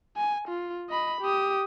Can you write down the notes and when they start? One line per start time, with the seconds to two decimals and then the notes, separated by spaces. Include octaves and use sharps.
0.17 G#5
0.48 F4
0.89 D#5 B5
1.21 G4 D#6